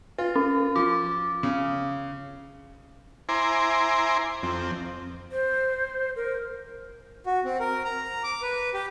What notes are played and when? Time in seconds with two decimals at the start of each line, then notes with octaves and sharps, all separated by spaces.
0.18 F4 B4
0.36 C#4
0.76 F3 D6
1.43 C#3
3.29 E4 C5 G#5 A#5 C6 D6
4.43 F2 C4
5.32 C5
6.16 A#4
7.26 F#4
7.45 C4
7.60 A#4
7.85 A#5
8.23 D6
8.42 B4
8.74 G4